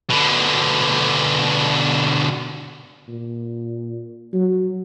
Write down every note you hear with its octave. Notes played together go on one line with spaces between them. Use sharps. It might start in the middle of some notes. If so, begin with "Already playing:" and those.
B2 D3
A#2
F#3